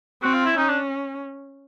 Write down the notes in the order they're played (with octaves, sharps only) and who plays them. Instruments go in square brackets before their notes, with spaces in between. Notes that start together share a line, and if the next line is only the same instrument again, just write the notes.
[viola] C4 [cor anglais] F#4
[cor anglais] F4
E4
[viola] C#4 [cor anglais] D#4
[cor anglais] D4